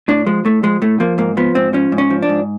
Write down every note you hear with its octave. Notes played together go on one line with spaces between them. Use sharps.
A2 D4
F3 G#3
A2 A3
F3 G#3
A2 A3
F3 A#3
G#2 A#3
F3 B3
G#2 C4
F3 C#4
G#2
C#4
F3
D4
G#2